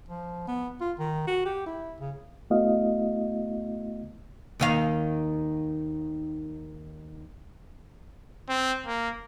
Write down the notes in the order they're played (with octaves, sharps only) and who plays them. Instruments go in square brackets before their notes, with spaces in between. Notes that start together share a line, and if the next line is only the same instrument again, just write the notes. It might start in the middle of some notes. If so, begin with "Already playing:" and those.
[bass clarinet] F3
B3
F4
D#3
F#4
G4
E4
C#3
[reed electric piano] A3 B3 E4 F#4 D#5 F5
[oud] D#2 D#3 F5
[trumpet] C4
A#3